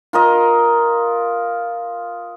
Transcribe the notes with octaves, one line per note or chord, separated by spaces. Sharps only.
F4 A#4 D#5